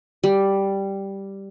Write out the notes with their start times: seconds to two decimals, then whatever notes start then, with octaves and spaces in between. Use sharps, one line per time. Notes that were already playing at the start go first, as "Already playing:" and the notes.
0.24 G3